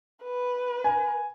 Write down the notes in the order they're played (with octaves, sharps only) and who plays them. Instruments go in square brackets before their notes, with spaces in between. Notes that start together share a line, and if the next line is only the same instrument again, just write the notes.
[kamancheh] B4
[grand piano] G#5